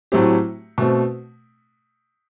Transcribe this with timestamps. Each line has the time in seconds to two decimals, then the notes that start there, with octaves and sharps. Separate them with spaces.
0.12 A2 F#3 A3 C4 G4
0.78 B2 A3 C4